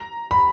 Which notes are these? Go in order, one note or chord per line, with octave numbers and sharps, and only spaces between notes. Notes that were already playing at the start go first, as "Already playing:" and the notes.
Already playing: A#5
B5